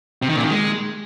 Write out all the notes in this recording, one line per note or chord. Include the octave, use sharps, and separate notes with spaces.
C3
D#3
A#2
D#3
G#3